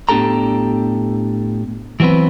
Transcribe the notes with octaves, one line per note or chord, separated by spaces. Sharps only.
A2 B3 D4 G4 A4 A#5
E3 F#3 B3 C4 B4